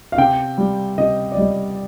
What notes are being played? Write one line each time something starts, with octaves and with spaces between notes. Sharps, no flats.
F5
C3 G5
G3
C3 D#5
D5
G3 D#5